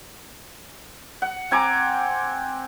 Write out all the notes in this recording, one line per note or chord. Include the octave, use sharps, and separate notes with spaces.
F#5
C4 G#5 A#5 D6